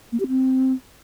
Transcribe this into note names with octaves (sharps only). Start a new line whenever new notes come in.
A#3
G4
C4